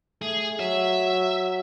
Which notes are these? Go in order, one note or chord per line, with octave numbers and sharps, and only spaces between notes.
A3 G#4
F#3 E5